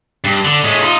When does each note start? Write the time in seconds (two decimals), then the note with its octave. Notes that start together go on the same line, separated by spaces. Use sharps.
0.24 G2
0.45 D3
0.64 A2 G#3
0.83 D#4 F4